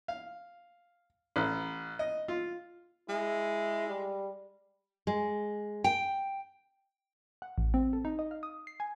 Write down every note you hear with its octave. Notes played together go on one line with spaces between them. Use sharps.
F5
A1
D#5
F4
G#3 E4
G3
G#3
G5
F#5
A1
C4
A4
D#4
D#5
F5
D#6
C7
G#5